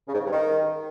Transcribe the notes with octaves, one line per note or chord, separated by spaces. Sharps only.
C#3
G#2
C#3
G2
D#3